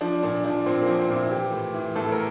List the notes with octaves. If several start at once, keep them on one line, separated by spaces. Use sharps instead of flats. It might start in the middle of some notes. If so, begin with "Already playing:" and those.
F3 D4
A#2 D4
F3 D4
A#2 C4
A#3
F3
C4
A#2 E4
E3 G4
A2
E3
A2 A4
A4
A#4